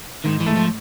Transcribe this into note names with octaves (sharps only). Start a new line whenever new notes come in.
G#2 D#3
E3
A3
F3